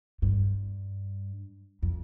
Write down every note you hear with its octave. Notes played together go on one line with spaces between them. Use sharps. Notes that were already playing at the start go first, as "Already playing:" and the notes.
G2
F2